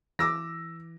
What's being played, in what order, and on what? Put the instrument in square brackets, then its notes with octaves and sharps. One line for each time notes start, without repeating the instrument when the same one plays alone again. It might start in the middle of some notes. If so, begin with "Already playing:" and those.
[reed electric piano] E3 [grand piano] D6 E6 A#6